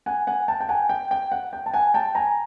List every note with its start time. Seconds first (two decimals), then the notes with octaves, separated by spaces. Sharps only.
0.06 F#5 G#5
0.27 F#5 G#5
0.48 G5 A5
0.60 G5
0.69 F#5 G#5
0.89 G5
1.11 G5
1.32 F#5
1.53 G5
1.66 A5
1.74 F#5 G#5
1.94 G5 A5
2.15 G#5 A#5